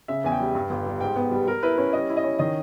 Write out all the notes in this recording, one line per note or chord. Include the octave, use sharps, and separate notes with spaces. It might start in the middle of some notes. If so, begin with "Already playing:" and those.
C#3 E5
E2 G#5
G5
G3
G2
G1
G3
G#2 G5
B3
G3
G3 A#4
E4 B4
C#4 B4
G3 D#5
E4
D#5
C#4
D#3 D#5